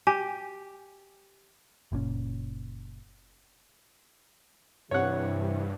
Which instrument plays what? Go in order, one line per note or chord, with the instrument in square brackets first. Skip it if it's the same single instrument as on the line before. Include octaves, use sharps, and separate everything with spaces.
[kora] G4 [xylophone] G#5
[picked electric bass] F#1 A#2 C#3 C#4
[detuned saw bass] G2 [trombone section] C3 E3 [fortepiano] C#5 F#5